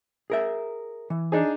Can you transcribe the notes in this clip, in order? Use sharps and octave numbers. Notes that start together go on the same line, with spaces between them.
G#4 A#4 E5
E3
D4 D#4 G#4